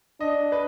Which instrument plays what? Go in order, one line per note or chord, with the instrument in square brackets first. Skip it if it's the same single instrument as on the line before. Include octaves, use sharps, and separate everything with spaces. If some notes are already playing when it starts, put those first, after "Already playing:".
[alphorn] D4 [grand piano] D#5
[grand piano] B4